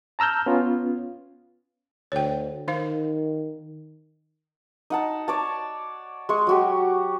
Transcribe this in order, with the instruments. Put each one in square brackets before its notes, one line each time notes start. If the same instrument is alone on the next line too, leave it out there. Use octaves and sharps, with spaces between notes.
[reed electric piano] A5 A#5 E6 F6 G6
B3 C#4 F4
[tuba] D2 [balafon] C#5 G5
[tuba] D#3 [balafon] D#4 C5 F5
[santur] D#4 F#5 A5
C#5 D5 A5
G#3 C#6
F#3 F#4 G4